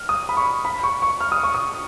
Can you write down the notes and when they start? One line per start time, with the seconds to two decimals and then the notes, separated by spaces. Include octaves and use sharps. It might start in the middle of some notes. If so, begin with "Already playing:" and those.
Already playing: F6
0.09 D#6
0.29 B5
0.37 C#6
0.65 B5
0.83 C#6
1.02 C#6
1.21 F6
1.32 D#6
1.43 C#6
1.55 D#6